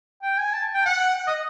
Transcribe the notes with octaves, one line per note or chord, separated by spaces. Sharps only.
G5
G#5
A5
G5
F#5
D#5